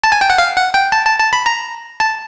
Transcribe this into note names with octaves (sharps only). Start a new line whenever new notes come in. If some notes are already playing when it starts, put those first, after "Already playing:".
A5
G#5
G5
F#5
F5
F#5
G5
A5
A5
A5
B5
A#5
A5